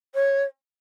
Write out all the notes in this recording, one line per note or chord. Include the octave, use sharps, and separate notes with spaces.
C#5